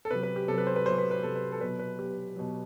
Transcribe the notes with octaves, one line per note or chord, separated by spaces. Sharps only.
A4
C3 F#3 B4
B4
G4
C3 F#3 A4
B4
C5
B4
C3 F#3 C5
B4
B4
C3 F#3 A4
B4
A4
B2 F#3 B4
B4
B2 F#3 G4
B2 F#3